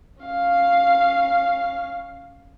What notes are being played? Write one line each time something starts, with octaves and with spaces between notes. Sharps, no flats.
C#4 F5